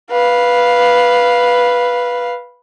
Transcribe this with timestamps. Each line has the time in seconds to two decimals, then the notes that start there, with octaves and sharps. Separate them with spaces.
0.12 B4 F5